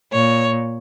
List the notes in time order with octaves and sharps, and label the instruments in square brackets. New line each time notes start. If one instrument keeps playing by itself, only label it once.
[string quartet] A#2 C#5